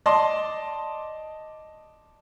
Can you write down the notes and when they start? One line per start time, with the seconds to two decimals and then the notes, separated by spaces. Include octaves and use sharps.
0.06 D5 D#5 A5 C6